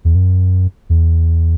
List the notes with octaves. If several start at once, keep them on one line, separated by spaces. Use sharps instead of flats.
E2
F#2
E2